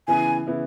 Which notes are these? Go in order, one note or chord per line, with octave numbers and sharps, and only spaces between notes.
C#3 E3 B3 E4 G#5
C#3 E3 B3 E4